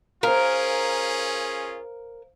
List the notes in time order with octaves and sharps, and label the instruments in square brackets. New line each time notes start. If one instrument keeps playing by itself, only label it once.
[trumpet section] C#4 F4 G#4 [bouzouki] A#4 [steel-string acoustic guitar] C5 F5